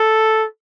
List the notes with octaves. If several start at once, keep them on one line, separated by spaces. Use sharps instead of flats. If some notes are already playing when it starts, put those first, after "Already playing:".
Already playing: A4